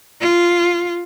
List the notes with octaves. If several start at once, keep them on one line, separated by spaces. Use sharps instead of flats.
F4